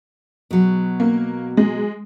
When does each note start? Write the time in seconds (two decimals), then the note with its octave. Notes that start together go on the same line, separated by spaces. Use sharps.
0.51 B2 F#3
1.00 A#3
1.57 G#3